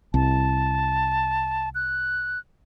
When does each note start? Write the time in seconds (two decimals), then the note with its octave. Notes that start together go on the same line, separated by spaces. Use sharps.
0.14 C2 A5
1.75 F#6